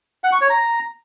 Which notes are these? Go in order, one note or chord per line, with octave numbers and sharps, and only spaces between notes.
F#5
C#6
C#5
A#5